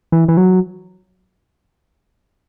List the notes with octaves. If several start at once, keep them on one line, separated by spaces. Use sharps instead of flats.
E3
E3
F#3